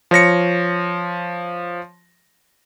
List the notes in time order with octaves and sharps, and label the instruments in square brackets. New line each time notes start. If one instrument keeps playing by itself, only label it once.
[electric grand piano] F3 C#5 A#6 C#7